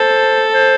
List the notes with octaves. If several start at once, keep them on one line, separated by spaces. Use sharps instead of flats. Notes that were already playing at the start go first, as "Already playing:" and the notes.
Already playing: A4 C5
C5